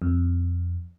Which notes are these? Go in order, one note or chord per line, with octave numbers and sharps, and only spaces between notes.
F2